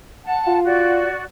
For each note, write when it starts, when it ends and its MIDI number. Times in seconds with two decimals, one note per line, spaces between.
0.24 0.59 78
0.24 0.59 81
0.47 1.06 65
0.64 1.23 66
0.64 1.23 74